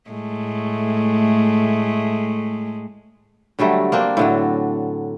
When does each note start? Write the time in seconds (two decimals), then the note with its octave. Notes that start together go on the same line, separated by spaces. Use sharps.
0.10 A2 G#3 A3
3.59 D3 F#3 G3 A3
3.92 A#3 C4 D4
4.17 A2 D3 F#3